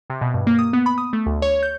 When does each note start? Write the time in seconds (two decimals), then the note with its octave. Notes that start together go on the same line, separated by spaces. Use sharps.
0.10 C3
0.21 B2
0.34 G2
0.47 A#3
0.59 D#6
0.73 B3
0.86 B5
0.98 D#6
1.13 A3
1.26 D2
1.42 C#5
1.63 G6